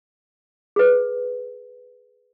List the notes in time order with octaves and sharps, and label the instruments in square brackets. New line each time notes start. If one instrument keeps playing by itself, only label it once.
[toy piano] G#4 B4